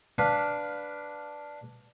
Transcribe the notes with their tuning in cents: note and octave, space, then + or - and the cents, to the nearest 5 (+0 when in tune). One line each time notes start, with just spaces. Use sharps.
D4 +0 B4 +0 F5 +10